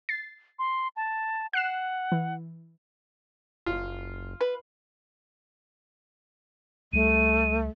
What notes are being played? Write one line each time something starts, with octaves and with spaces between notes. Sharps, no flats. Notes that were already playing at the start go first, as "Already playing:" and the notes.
A6 C7
C6
A5
F#5 F#6 C7 E7
E3
F#1 F4
B4
C#2 G3 A3 D#7